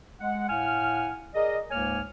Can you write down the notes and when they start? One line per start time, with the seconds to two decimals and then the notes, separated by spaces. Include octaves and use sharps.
0.20 G#3 F#5
0.49 A2 F5 F#5 G#5 F6
1.34 G#4 A#4 D5 D#5
1.71 C#2 G#2 A#3 C#5 G#5 F6